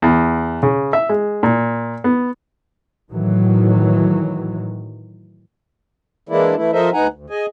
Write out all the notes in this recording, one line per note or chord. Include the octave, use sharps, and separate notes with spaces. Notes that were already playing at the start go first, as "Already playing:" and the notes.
E2
C#3
E5
G#3
A#2
B3
A2 D#3 E3 F#3
E3 G#3 A#3 D4 E4
E3 A3 E4
F3 A4 A#4 C5 D#5 E5
D2 B3 D#4 F#5 G#5 A#5
D2
G#4 D#5 G#5